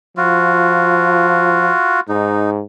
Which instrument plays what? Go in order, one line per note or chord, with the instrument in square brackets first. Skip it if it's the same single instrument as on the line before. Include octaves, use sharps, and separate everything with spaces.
[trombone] F3 [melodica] F4 F#4
[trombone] G#2 [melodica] D#4